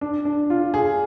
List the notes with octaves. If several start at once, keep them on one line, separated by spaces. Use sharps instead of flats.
D4
D4
F4
G#4